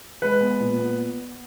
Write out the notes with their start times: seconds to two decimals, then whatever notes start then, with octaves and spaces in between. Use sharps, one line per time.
0.22 G#3 B4
0.41 B3
0.60 A#2
0.79 B3